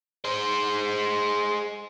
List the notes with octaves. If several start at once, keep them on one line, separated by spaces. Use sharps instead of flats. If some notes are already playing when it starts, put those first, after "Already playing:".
G#3 C5